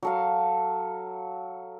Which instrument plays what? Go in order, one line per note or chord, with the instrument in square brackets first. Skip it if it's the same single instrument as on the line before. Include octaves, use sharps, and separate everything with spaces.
[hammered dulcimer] F#3 A4 F5